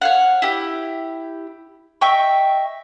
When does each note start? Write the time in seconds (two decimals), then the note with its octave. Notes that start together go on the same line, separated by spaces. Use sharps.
0.01 C#5 F5 F#5
0.42 E4 G4
2.01 D#5 E5 G5 C#6